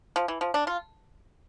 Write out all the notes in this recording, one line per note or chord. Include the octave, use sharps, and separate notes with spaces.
F3
E3
F3
D4
F4